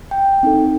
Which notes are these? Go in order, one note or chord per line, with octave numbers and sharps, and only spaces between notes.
G5
C4 D#4 A4